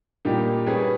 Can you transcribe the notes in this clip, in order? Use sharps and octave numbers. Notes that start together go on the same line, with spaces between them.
A#2 G3 A#3 D#4 G4
G3 C#4 G#4 B4